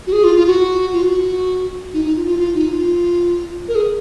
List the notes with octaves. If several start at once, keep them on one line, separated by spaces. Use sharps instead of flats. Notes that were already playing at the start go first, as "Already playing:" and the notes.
F#4
G#4
F4
F4
F#4
F4
F#4
D#4
D#4
F4
F4
F4
D#4
F4
A#4
G#4